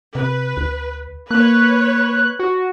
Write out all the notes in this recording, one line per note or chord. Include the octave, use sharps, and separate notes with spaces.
C3 B4
D2
A#3 B4 C#5 F#6
F#4